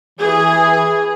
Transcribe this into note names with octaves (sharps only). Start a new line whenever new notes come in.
E3 G#4